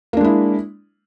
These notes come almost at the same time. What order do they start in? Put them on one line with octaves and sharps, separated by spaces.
A#3 D4 G#3 E4